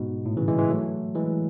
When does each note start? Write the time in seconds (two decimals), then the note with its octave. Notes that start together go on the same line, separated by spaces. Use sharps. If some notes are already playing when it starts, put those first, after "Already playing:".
Already playing: G#2 B2
0.25 A2
0.37 C#3 E3
0.48 E3 G#3
0.58 E3 G#3
0.70 F#3 A3
1.15 E3 G#3